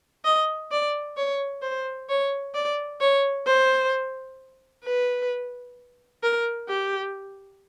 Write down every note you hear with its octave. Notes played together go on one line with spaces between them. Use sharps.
D#5
D5
C#5
C5
C#5
D5
C#5
C5
B4
A#4
G4